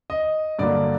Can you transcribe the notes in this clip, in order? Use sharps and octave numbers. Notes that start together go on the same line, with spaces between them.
D#5
G2 D3 F#3 A#3 D5